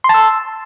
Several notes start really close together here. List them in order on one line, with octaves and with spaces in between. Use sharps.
C6 A5 E6